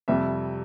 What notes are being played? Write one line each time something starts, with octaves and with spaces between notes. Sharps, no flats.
F2 C3 G3 E5